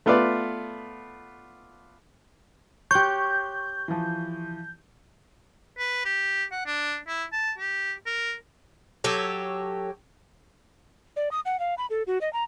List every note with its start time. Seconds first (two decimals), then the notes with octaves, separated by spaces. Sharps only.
0.06 A3 B3 F4 B4 D5 E5
2.91 G4 C#5 C6 C#6 F#6 G6
3.88 E3 F3
5.78 B4
6.05 G4
6.52 F#5
6.66 D4
7.08 E4
7.32 A5
7.58 G4
8.06 A#4
9.04 F#3 G4 A4 C#5
11.16 D5
11.31 D#6
11.45 F#5
11.59 F5
11.78 B5
11.90 A4
12.07 F#4
12.21 D#5
12.33 A#5